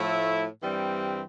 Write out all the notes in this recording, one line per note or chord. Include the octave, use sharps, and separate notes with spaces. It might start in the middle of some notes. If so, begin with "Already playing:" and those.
Already playing: A2 F3 A3 E4
G2 E3 G3 C4